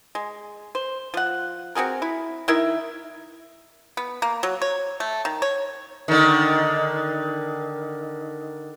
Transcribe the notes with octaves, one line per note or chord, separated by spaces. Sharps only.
G#3
C5
F3 F#5
C4 F#4 G#4 A#4
E4
D#3 E4 A#4 E5
B3
A#3
F#3
C#5
A3
D#3
C#5
D3 D#3